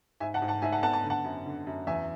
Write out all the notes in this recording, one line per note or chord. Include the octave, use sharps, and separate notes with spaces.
G#2 E5 G#5
F#5 A5
G#2
F#5 A5
G#2 E5 G#5
F#5 A5
B3 F#5 A5
A5
D3
F#5 A5
F#2
D3
F#2
E2 E5 G#5